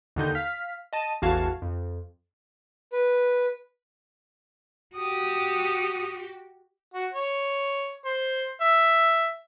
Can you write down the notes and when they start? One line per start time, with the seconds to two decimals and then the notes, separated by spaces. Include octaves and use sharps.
0.16 D#2 D3 D#4 G6
0.35 F5 F6 B6
0.93 D#5 A5 D#7
1.22 A1 E2 F#4 F5 A5 G#6
1.62 F2
2.92 B4
4.96 F#4 G4 D#6
6.94 F#4
7.13 C#5
8.05 C5
8.61 E5